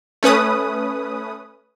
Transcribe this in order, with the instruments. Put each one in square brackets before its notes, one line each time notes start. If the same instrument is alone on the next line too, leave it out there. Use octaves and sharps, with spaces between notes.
[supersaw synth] A3 C#4 B4 D#6